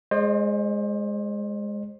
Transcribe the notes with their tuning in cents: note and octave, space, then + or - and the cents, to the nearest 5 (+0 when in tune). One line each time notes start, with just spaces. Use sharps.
G#3 +0 C5 +25 D#5 -45